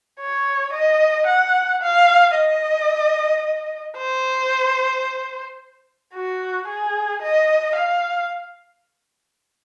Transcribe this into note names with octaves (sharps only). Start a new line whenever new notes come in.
C#5
D#5
F#5
F5
D#5
C5
F#4
G#4
D#5
F5